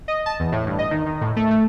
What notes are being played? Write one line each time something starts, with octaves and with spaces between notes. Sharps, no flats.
D#5
A5
E2
A2
G2
D#5
D#3
D#3
A2
A3
A3